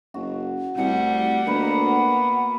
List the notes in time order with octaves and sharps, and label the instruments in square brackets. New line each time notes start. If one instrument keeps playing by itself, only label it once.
[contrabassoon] F#1 [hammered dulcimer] F#4
[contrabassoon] C2 [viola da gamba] G3 A3 [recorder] F#5
[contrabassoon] D2 [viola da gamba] A#3 B3 [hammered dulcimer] A#4 B4